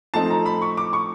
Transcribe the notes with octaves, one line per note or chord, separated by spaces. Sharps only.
F3 A3 C4 D#4 A5
A#5
B5
C#6
D6
C#6